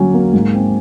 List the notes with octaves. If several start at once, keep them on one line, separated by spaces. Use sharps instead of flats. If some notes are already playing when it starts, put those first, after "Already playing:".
Already playing: D3 F#3 A#3 C#4 G#5
A#3
G#2
C4